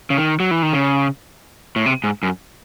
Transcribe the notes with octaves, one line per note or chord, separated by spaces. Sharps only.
C#3
D#3
F#3
E3
D#3
C#3
A2
C3
G#2
F#2